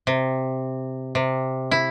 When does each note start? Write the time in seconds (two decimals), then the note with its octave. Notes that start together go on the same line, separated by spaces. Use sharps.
0.07 C3
1.15 C3
1.71 E4